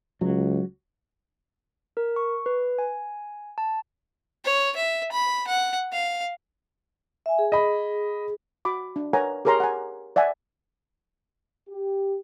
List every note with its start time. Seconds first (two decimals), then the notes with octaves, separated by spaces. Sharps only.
0.21 C#2 F#3
1.97 A#4
2.16 C#6
2.46 B4
2.79 G#5
3.58 A5
4.45 C#5
4.76 E5
5.12 B5
5.48 F#5
5.92 F5
7.26 E5 G#5
7.39 G#4
7.52 D#5 B5
8.65 F#4 B5 D6
8.96 D4
9.13 A#4 B4 C#5 F#5 G#5 A#5
9.45 G4 G#4 A#4 C#5 A#5 C6
9.60 F#5 G#5
10.16 D5 E5 F#5 G#5
11.68 G4